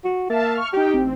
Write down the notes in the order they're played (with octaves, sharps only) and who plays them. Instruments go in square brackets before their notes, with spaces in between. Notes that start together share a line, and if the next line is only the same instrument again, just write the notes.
[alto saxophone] F#4
[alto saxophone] A#3 [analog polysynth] E5 F5 A5
[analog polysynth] C#6 F6
[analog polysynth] D#4 G5 [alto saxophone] G4
[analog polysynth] A1 C4